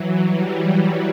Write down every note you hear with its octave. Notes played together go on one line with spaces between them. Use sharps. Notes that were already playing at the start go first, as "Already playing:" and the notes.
Already playing: E3 F#3
G3